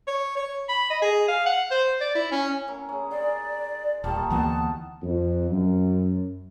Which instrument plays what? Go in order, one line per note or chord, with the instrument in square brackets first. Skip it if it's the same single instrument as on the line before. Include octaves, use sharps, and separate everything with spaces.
[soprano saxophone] C#5
C#5
B5
D#5
G#4
F5
F#5
C5
D5
E4
C#4
[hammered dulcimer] C#4 E4 A#4
C#4 G#4
[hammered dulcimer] D#4 G#4 C6 [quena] D5
[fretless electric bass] D#1 [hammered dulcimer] A#2 D#3 G3 [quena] A5
[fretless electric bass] D2 E3 A#3 [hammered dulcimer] G3 B3 F#4 [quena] A5
[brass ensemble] F2
F#2